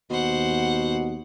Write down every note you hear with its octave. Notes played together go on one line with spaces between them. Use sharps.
D#2 B2 C5 F#5